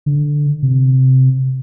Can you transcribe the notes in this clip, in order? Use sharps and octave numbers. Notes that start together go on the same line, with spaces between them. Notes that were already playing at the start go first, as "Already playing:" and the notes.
D3
C3